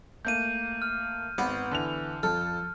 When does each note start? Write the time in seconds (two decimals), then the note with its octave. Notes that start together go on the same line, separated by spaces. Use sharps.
0.25 A3 A#3 G6 D#7
0.82 F6
1.38 G#1 B3 F#4
1.71 D3 E3 F7
2.23 F2 A4 F6